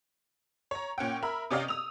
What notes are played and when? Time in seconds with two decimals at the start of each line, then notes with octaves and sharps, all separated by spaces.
0.71 C#5 A#5
0.98 A#2 C#4 F#5 G5
1.23 A#4 E5 B5
1.51 C3 C#4 G4 D5 D#5 F5
1.68 D#6 E6 F7